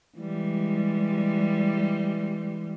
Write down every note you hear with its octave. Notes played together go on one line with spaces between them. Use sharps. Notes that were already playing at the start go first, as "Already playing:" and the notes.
E3 G3 G#3